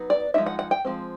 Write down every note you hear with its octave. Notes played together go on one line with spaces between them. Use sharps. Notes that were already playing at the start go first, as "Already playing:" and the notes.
Already playing: F#3 B3 D#4
D5
F3 G#3 C4 D#4 E5
F#5
F#5
G5
F3 G#3 C4